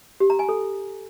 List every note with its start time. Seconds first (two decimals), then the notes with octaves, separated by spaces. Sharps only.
0.20 G4
0.30 A#5
0.39 G#5
0.49 A4